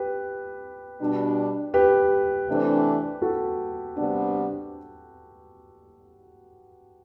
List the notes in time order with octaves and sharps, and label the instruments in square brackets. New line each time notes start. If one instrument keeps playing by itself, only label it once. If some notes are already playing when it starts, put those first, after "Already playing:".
Already playing: [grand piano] G4 B4
[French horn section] B2 G3 D4
[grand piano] G4 B4
[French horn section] C3 E3 A3 D4
[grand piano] F#4 A4
[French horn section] C3 G3 B3 D4